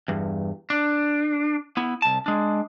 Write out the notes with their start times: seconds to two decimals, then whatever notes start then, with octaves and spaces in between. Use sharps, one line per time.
0.08 E2 G2
0.70 D4
1.77 B3 E4
2.02 C2 A5
2.26 G#3 D4